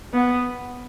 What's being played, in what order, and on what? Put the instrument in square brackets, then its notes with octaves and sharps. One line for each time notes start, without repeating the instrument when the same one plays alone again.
[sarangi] B3